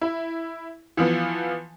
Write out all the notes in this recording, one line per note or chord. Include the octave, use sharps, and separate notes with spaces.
E4
E3 F3 B3